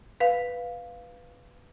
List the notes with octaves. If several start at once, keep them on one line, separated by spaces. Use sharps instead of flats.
B4 F5